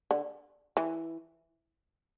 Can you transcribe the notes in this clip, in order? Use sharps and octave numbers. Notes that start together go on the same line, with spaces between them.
D3
E3